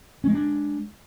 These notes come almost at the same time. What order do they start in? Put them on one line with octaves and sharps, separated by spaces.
C#4 G#3 A#3 D4